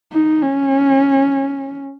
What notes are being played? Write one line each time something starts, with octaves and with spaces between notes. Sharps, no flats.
D#4
C#4